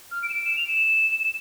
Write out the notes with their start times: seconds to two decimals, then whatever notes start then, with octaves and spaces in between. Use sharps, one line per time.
0.11 F6
0.23 D7
0.30 E7
0.34 D7
0.45 E7
0.57 F7
0.68 E7